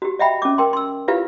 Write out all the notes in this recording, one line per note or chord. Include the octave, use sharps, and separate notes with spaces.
F#4 G4
D#5 E5 F#5 G5 B5
C#4 D6
A#4 G5 C6
C6 E6
E4 F4 G4 B4 F5